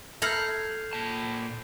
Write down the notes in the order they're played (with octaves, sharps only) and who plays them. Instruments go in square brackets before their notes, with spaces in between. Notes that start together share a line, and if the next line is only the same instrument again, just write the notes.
[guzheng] A4 A#5 B5 [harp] F6 G#6 [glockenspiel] G6 C7 F7
[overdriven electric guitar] A#2 A5